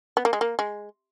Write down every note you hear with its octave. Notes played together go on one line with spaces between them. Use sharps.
B3
A#3
G#3
A#3
G#3